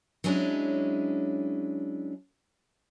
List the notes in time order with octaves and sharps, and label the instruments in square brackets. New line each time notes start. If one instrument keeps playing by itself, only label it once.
[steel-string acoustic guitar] F#3 G#3 C#4 D4 E4